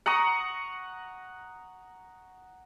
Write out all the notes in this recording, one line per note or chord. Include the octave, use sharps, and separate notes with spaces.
F#5 A#5 C#6 D#6